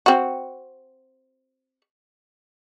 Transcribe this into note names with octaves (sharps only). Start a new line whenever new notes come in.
C4 F#4